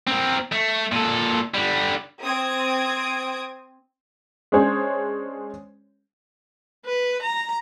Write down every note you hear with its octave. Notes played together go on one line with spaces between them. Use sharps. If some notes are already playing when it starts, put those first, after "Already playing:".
C4 A#4
A3
A#2 A4
D3 G3
C4 D#6 G#6 D7
G#3 C#4 D4 G#4 C5 C#5
B4
A#5